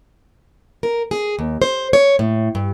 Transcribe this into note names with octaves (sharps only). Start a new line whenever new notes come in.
A#4
G#4
D#2
C5
C#5
A2
G2